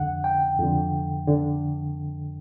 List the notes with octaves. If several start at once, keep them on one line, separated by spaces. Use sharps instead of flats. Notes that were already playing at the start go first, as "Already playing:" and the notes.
Already playing: F2 D3 F#5
G5
F2 D3
D3